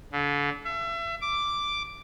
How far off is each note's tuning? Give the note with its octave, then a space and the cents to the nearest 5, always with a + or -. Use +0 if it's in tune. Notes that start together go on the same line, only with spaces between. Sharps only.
D3 -35
E5 +35
D6 +0